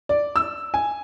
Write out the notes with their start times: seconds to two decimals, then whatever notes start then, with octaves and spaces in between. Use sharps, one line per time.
0.09 D5
0.36 E6
0.74 G#5